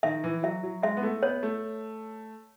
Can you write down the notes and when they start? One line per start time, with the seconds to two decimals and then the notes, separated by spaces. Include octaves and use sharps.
0.03 D#3 E5
0.24 E3
0.43 F#3 E5
0.63 F#3
0.82 G#3 E5
0.97 B3
1.03 A3
1.22 B3 C#5
1.43 A3